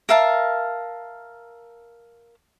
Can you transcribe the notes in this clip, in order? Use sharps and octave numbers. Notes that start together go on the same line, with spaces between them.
A#4 E5 F5 A5